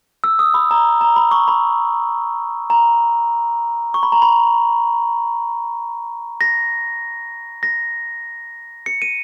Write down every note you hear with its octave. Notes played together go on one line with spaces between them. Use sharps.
E6
D#6
B5
A#5
A#5
B5
C#6
B5
A#5
C#6
B5
A#5
B5
A#6
A#6
C#7
D#7